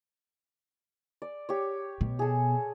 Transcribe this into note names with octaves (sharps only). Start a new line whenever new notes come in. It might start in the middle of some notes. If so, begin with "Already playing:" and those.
D5
G4 C#5
B2
G#4 A4